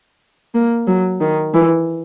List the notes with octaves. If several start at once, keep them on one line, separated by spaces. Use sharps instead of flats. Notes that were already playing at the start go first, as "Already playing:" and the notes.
A#3
F#3
D#3
E3